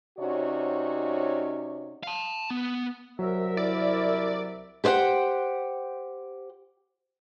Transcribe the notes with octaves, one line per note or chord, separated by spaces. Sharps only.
C3 C#4 D#4 F#4 C#5 D5
F5 A5
B3
C2 F#3 A#4 E5
E4 D5
G4 C5 D5 F#5 G5